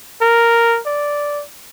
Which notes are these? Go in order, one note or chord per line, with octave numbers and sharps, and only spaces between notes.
A#4
D5